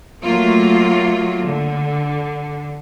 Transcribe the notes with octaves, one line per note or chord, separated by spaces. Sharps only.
F#3 A3 A#3 F4
D3